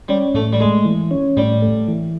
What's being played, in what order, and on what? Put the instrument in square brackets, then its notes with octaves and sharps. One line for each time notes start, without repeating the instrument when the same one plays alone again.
[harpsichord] G3 [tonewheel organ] C#4
[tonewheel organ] A2 [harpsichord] A3
[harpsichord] G3
[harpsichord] G#3 [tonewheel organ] A3
[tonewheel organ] E3
C#4
[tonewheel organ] A2 [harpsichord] G3
[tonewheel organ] A3
E3